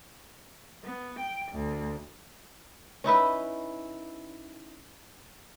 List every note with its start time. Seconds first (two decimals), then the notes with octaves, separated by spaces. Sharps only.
0.84 B3
1.19 G5
1.53 D2
3.04 C#4 D#4 E4 B4